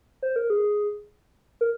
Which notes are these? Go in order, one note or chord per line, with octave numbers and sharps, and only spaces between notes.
C5
A#4
G#4
A#4